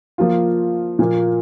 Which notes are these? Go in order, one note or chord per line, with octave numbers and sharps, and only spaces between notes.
F3 A#3 F4
A#2 F3 A#3 F4